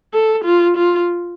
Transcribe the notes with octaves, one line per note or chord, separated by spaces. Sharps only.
A4
F4
F4